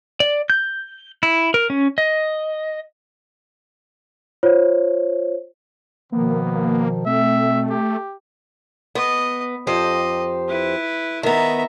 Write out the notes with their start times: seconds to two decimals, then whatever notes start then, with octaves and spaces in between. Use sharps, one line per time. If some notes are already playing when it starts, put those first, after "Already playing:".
0.20 D5
0.50 G6
1.23 E4
1.54 A#4
1.70 C#4
1.98 D#5
4.43 F4 C5 C#5
6.12 B2 D#3 F3 A#3 B3
7.06 B2 A3 C4 E5
7.70 G4
8.95 B3 D#5
9.67 F2 G4 C5 D#5
10.48 E4 B4
11.23 D#3 B3 E5 A#5